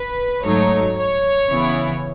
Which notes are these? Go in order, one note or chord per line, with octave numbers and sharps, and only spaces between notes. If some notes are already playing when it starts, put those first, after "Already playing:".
Already playing: B4
G#2 F#3 A3 D#4 C#5
C#5
C#3 E3 B3 E4